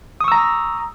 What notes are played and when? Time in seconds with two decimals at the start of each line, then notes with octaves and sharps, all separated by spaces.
0.21 D#6
0.24 C#6
0.28 E6
0.32 A#5